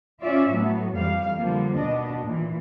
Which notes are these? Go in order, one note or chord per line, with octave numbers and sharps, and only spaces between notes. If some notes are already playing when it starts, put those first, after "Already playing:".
C#4 F4 D5 E5
A2 F#3 B3
F2 E3 G3 F5
D3 F3 G3 A#3
D#2 B2 D4 D#5
A#2 E3